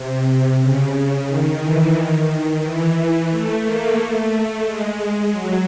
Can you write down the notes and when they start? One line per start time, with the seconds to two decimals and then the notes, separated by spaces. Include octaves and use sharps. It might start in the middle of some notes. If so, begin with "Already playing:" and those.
Already playing: C3
0.61 C#3
1.28 D#3
1.62 E3
1.95 D#3
2.63 E3
3.31 A3
3.64 A#3
3.98 A3
4.65 G#3
4.99 G#3
5.32 F#3